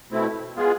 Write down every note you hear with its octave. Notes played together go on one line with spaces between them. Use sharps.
B2 A3 C4 E4
G#3 B3 F4 G#4